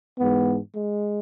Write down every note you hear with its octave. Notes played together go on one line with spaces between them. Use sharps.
G#2 E3 G#3 B3
G#3